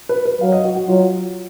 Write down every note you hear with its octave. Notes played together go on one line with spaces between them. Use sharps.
B4
B4
F#3 F5
D#5
F#4
F#4
F#3 F4